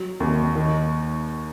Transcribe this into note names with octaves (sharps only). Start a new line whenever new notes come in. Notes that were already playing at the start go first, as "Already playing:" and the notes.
Already playing: F#3
D#2
D#3